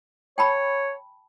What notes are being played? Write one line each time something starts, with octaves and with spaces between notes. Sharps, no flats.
C#5 G5 A5 B5